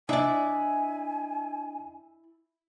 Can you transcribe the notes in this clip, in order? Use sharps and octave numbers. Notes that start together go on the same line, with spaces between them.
D4 E4 D5 D#5 G#5